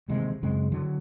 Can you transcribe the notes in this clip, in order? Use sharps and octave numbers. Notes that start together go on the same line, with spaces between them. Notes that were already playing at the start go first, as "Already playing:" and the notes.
A1 D#2 C3 G#3
F#2 C#3 G#3 C4
D3 F#3